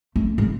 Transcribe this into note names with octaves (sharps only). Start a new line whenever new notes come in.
A3
G#3